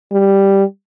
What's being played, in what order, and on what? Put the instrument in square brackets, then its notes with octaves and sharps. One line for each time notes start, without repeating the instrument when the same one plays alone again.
[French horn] G3